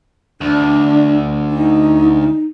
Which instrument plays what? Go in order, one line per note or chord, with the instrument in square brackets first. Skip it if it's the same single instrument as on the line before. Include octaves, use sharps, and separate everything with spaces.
[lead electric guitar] D2 [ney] D4
[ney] D#4